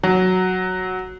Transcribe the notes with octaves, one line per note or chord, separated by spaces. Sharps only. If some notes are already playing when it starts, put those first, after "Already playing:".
F#3